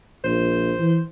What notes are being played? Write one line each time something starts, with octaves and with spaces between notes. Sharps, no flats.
A#1 C5
E3